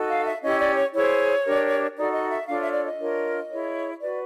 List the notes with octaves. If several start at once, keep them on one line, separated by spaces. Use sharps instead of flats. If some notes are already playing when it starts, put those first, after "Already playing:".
Already playing: D#4 F#4 A4
F5
E5
C#4 E4 G4 D#5
D5
C#5
E4 G#4 C5 C#5
D4 G4 A#4
D#4 F#4 A4 D5
D#5
E5
D4 F4 A4 C#5 F5
E5
D5
D#5
D4 F4 A#4 C#5
E4 G#4 C#5
F#4 B4 D5